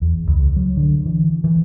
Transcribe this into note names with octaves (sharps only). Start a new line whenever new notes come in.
E2
C#2
F#3
D3
E3
E3